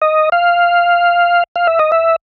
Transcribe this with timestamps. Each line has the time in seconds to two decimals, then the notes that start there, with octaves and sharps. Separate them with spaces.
0.02 D#5
0.32 F5
1.56 F5
1.67 E5
1.79 D#5
1.92 E5